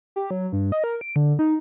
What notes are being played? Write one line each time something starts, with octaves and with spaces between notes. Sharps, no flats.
G4
F#3
G2
D#5
A#4
D7
D3
D#4